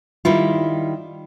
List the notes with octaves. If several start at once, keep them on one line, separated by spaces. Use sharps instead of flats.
D#3 G3 E4 F4